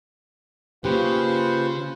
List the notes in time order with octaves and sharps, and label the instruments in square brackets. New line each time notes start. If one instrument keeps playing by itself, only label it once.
[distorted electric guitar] C#3 [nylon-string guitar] A#3 G4 [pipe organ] F4 [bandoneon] B4 C5